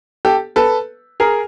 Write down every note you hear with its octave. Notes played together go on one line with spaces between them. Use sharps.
G4 A4
A4 B4
G#4 A#4